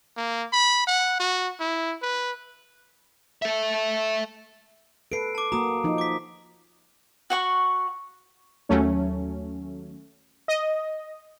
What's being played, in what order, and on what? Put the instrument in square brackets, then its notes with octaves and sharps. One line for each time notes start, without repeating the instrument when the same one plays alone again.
[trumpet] A#3
B5
F#5
F#4
E4
B4
[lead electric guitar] A4 E5
[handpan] A4 B4 [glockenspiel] C7 D7
[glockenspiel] A5 D6
[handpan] A#3 F#4 [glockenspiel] A#5 D#6
[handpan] F3 D#4
[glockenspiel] D6 B6
[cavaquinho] F#4 F#5 C#6
[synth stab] D#2 F#3 A3 C#4
D#5